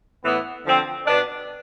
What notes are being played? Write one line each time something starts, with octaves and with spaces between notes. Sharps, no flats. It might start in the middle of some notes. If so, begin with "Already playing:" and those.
A2 E3 B3
D3 F3 C4
B2 B3 D4